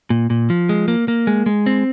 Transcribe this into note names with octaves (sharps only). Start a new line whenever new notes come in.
A#2
A#2
F3
G#3
A#3
A#3
G#3
G#3
C4